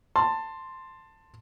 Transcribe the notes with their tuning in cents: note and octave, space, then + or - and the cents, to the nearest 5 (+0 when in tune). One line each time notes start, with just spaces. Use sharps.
A5 +15 C6 +0